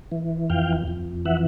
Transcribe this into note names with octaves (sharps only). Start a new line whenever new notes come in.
E3
F2 F5 G5
F2
E3 E5 F#5